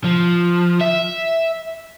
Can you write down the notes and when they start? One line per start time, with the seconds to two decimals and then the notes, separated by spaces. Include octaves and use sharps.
0.04 F3
0.81 E5